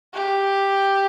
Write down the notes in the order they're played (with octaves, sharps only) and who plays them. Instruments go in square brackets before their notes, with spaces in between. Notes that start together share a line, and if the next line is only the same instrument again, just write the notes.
[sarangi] G4